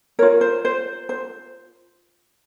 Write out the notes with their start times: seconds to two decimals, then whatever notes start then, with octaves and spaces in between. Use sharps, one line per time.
0.19 A#4 C#5
0.22 F4
0.41 C5
0.65 C5
1.09 C5